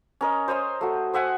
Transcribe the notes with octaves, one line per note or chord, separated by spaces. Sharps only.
C#4 A#4 D#5
C5 C#5 D#5 C6
A3 F#4
C5 E5 F#5 G#5